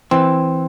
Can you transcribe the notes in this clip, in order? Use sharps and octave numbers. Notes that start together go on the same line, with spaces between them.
E3 C4